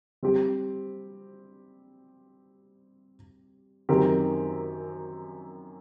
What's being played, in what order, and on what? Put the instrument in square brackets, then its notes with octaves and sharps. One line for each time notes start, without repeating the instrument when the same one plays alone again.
[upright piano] G3 C4 G4
F#2 D#3 F#3 C4 G4